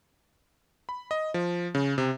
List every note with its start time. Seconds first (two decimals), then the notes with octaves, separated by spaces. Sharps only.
0.89 B5
1.11 D#5
1.34 F3
1.75 C#3
1.98 C3